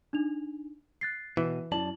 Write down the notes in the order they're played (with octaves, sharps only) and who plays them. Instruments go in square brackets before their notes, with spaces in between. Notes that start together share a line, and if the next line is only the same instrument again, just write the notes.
[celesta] D4 D#4 F7
F#6 A6 C7
[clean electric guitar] B2 [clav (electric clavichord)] E3
[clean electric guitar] F#2 D5 A5 [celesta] E4 F#7